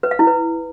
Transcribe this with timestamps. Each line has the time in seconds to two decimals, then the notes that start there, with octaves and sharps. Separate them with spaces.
0.03 B4
0.11 F5
0.19 E4
0.27 B4